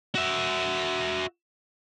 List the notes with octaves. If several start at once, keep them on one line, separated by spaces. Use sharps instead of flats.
F#4 E5